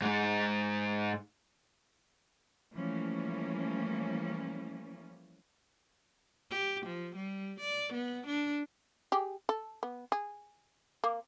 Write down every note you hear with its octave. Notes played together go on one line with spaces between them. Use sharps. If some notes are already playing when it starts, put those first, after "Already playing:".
G#2 G#3
E3 F3 G3 A3 A#3 C#4
G4
F3
G3
D5
B3
D4
G4 G#4
A4
B3
G#4
A#3